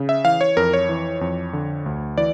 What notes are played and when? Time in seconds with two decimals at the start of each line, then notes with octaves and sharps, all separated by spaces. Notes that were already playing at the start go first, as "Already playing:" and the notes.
Already playing: C#3
0.09 E5
0.25 E3 F5
0.41 C#5
0.57 F2 A#4
0.73 C#5
0.89 E3
1.21 F2
1.53 D3
1.86 D2
2.18 E3 D5